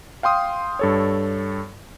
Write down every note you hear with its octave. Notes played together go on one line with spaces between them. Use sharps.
F5 G5 C6 D#6
G2 A4 C#5